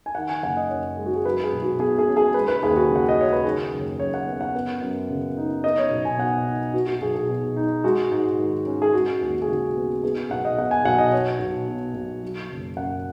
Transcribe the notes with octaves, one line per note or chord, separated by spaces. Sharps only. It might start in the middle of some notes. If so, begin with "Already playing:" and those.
G#5
D#3 F#5
G#5
F#1 F#5
D#5
F#2 C#5
G#3
F#4
G#4
F#3 B4
G#4
B1
F#4
B2 G#4
G#4
C#4
G#4
G#3 B4
B4
D#2 G#4
F#4
C#3
F#5
D#5
C#4 C#5
B4
D#3 G#4
F#1
F#2 C#5
F#5
B3
F#5
B3
F#2
C#3
D#4
B3 D#5
C#5
B1
G#5
B2 F#5
D#4
B3 F#4
F#4
B1 G#4
G#4
B2
D#4
G#3 F#4
G#2
D#3
C#4
G#4
G#3 F#4
D#2
G#4
C#3 F#4
B3
B3 G#4
B1 F#5
D#5
B2 F#5
G#5
B1 F#5
D#5
B3 C#5
B1
B2
B1
F#3
F#1
F#2 F#5